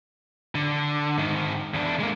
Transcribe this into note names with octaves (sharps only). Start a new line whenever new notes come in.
D3
G#2 D#3
E2 D4
G#3 A#3